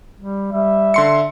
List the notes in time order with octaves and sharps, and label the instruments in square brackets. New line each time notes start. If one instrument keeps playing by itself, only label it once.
[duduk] G3
[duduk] G3 [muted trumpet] E5
[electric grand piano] D3 C6 C#7